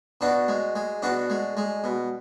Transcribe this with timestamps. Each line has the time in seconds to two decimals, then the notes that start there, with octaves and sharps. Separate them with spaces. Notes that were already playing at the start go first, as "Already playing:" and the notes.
0.21 B2 D4 F#4
0.48 G#3
0.76 G#3
1.02 B2 D4 F#4
1.30 G#3
1.57 G#3
1.84 B2